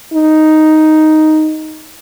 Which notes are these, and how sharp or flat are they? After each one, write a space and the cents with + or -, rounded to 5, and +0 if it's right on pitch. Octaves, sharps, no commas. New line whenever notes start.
D#4 +0